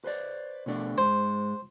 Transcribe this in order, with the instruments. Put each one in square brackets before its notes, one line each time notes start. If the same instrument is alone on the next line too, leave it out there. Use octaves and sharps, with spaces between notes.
[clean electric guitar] B4 C5 D5
B2 A3 D4
[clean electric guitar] G#2 G#3 [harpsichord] C5